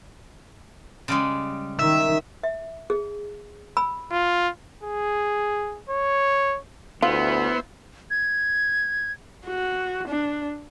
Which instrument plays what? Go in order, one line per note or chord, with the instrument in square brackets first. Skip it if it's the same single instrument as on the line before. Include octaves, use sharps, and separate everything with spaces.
[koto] C#3 G3 G#3
[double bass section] D#3 [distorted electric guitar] E5
[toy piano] E5
G#4
B5 E6
[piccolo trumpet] F4
[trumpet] G#4
C#5
[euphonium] D2 [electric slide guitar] B3 [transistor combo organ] E4 C5 [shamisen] F4
[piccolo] G#6
[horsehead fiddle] F#4
D4